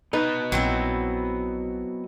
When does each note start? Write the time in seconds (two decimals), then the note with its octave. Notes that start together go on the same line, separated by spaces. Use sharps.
0.13 B3 D#4 B4 D#5
0.52 A#1 F#3 C4 E4